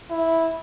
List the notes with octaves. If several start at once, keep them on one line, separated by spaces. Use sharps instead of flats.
E4